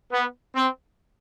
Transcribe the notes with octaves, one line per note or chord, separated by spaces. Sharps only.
B3
C4